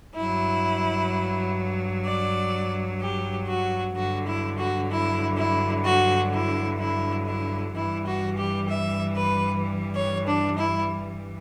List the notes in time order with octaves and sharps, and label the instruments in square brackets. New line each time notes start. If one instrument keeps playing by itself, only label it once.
[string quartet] G2 F#3 E4
D5
G4
F#4
G2 D3 F#3 F#4
E4
F#4
E4
E4
F#4
E4
E4
E4
G2 E3 G3 E4
F#4
G4
E5
B4
C#5
D4
E4